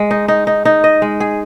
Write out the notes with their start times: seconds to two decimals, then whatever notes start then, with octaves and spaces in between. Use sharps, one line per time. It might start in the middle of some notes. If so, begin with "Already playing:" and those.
Already playing: G#3
0.11 D#4
0.28 D#4
0.47 D#4
0.65 D#4
0.84 D#5
1.02 G#3
1.20 G#4